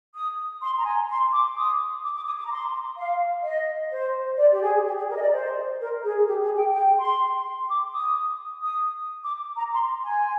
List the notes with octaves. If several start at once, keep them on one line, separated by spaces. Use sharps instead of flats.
D#6
C6
A#5
G#5
C6
D6
D#6
D6
D6
D#6
D6
A#5
C6
F5
D#5
C5
D5
G4
G#4
G4
G#4
A#4
D#5
D5
C5
A#4
G#4
G4
G#4
G5
G5
C6
D6
D#6
D#6
D6
A#5
C6
G#5